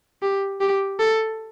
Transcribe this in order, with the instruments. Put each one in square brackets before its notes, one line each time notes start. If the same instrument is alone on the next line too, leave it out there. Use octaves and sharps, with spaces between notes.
[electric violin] G4
G4
A4